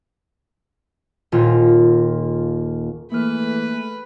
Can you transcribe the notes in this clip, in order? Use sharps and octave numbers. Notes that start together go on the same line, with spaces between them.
D#1 A#2 F4
E3 A3 A#3 G#4 A4 B4 F6